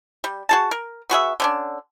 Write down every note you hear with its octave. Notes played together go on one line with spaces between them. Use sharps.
G3
F#4 G#4 A5
A#4
B3 F#4 G#4 E5
D3 C#4 D4